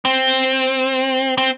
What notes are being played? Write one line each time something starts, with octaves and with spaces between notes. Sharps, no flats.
C4
C4